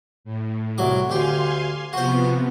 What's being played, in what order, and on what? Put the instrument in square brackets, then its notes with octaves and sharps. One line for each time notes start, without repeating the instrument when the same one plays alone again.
[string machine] A2
[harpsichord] C2 F#3 D6
[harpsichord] D2 G4 [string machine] F5 G#5 C6
[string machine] C3 F3 B3 [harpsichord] F#4 C5